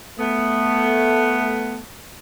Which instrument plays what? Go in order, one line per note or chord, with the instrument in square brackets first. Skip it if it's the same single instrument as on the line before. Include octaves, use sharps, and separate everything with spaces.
[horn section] A3 B3